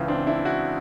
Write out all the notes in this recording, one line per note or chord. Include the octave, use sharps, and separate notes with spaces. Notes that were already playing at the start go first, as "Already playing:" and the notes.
Already playing: C#2 C#3 E3
C4 D4
D4 E4
E4 F#4